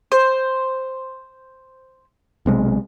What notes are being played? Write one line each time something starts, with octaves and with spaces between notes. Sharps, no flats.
C5
B1 C3 G#3